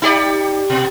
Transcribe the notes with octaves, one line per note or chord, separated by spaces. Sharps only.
D#4 G4 D5
B2